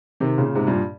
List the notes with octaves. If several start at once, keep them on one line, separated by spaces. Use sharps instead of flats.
C3 D#3
A#2 C#3
G#2 C3
G2 A#2